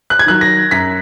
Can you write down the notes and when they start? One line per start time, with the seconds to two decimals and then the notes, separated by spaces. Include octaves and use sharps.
0.10 F#6
0.19 G#6
0.26 D#3 F#3 F#6
0.41 A#6
0.71 F#2 B6